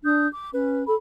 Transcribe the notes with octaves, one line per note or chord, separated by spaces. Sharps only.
D4 D#6 G6
D6
C#4 B4
A4 B5